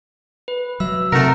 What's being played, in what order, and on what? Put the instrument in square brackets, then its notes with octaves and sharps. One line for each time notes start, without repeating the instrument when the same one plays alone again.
[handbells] B4
[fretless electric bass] F#3 [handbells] E5 E6
[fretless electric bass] C3 [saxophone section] A3 A#4 E5 [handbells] D#4 F#5 A#5